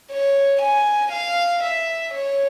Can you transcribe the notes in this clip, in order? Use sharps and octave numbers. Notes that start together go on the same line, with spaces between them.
C#5
G#5
F5
E5
C#5